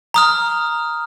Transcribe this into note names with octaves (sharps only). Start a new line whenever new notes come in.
A#5 D#6 F6